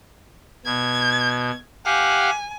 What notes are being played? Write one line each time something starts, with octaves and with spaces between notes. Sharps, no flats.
B2 G#6
G4 F5 F#5 G#5